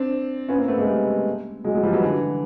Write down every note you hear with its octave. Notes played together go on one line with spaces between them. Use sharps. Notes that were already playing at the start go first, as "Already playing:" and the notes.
Already playing: C4 D4
B3 C#4
A#3 C4
A3 B3
G#3 A#3
G3 A3
F#3 G#3
F#3 G#3
F3 G3
E3 F#3
D3 E3